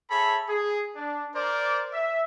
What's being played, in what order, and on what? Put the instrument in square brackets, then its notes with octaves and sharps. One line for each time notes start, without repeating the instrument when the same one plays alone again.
[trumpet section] G#4 A4 C#5 E5 B5
G#4
D4
A#4 C5 D5
E5